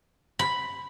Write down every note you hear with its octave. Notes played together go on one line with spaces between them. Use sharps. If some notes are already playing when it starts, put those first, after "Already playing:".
B5